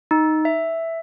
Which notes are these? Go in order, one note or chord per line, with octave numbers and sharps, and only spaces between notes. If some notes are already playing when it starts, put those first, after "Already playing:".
D#4
E5